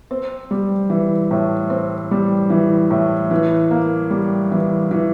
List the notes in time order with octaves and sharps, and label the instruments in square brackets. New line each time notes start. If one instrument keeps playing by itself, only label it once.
[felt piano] C4
G3
E3
A2
C4
G3
E3
A2
E3
A#3
G3
E3
E3